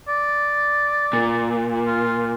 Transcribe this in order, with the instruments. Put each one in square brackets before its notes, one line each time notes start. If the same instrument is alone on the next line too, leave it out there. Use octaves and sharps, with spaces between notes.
[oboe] D5
[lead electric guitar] A#2
[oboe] F4